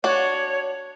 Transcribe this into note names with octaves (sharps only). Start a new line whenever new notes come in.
D4 F#4 C#5